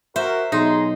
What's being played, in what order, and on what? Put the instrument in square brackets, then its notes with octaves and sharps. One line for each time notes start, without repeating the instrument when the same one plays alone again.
[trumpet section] F#4 A#4 [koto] C5 [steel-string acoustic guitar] E5
[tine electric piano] B1 [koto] D#4 [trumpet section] G#4 A#5 C6